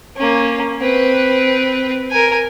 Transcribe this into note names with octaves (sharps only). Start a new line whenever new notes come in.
A#3 C#4
C4 B4
A#4 G#5